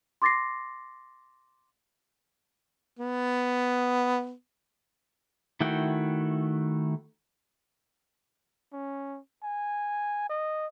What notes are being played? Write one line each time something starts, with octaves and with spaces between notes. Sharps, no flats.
C6 D6 A6 A#6 C7
B3
D#3 A3 E4 F#4 G5
C#4
G#5
D#5